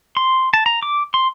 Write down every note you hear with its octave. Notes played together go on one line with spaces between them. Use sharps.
C6
A5
A#5
D6
C6